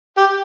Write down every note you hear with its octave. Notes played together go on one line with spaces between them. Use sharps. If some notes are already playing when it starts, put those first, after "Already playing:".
G4